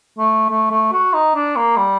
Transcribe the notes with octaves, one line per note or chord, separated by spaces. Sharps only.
A3
A3
A3
F#4
D#4
D4
A#3
G3